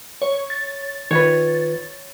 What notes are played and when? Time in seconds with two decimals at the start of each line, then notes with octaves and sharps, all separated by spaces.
0.22 C#5
0.50 A6
1.11 D#3 F4 B4 C#5